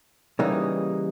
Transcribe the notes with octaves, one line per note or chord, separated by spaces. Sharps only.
C#3 E3 G3 A#3 D#4